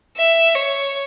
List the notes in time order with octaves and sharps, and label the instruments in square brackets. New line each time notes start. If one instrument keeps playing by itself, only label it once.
[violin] E5
C#5